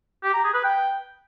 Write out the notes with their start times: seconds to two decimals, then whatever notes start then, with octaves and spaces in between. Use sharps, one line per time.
0.24 G4
0.34 A#5
0.44 G#4
0.54 B4
0.64 G5